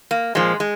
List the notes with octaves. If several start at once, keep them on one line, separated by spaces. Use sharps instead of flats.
A#3
A#2 F3 G#3
G#3